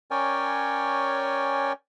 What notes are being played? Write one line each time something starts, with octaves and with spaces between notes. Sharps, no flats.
C#4 A#4 C#5 D5 G5 G#5